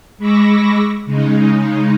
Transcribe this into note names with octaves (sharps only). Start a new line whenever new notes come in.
G#3 B5 C#6 D6 E6 A#6
C#3 G#3 D#4